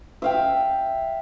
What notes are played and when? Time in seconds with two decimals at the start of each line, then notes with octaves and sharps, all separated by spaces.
0.22 E5 F5 G5